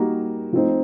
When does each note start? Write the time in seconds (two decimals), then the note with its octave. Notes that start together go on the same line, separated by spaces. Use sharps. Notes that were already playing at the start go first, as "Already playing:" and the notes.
Already playing: G3 A#3 D#4 F#4 A#4
0.52 F3 A3 C4 D#4